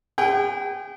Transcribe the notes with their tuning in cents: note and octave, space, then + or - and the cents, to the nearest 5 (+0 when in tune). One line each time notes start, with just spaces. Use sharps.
G#4 -45 G5 -35